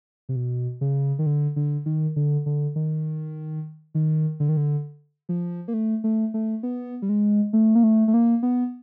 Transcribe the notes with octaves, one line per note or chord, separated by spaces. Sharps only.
C3
B2
C#3
D#3
D3
D3
D#3
D3
D3
D#3
D#3
D3
D#3
D3
F3
A#3
A3
A3
A3
B3
G3
G#3
A3
A#3
A3
A3
A#3
B3